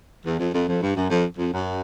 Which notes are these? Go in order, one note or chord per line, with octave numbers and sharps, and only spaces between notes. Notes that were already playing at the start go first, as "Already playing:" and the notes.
E2
F2
F2
F2
G2
F#2
F2
F2
F#2